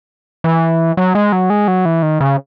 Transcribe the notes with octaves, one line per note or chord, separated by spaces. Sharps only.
E3
F#3
G#3
F#3
G#3
F#3
E3
D#3
C#3